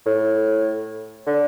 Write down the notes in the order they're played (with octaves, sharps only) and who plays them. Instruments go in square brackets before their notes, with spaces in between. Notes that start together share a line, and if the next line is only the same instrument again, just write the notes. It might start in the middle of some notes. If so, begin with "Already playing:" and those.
[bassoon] A2
D3